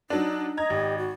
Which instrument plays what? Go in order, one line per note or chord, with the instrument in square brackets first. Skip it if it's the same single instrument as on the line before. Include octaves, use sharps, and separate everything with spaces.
[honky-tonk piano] F#3 D4 [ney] D#4
[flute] D#5 [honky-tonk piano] A#5 G#6
[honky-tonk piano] G#1 [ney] G4
[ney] F#4